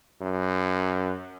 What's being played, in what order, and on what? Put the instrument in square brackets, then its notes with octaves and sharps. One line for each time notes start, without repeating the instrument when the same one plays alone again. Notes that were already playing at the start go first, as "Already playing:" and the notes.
[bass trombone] F#2